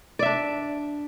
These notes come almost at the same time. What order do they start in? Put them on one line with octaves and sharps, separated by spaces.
D5 E5 D4